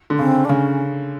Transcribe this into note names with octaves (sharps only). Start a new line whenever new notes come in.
D3
C#3 C4
D4
C#3 C#4